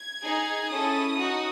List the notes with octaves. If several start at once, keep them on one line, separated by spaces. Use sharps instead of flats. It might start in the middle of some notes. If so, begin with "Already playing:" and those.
Already playing: G#6
D#4 G#4
C#4 E4 A4 D#6
D#4 F#4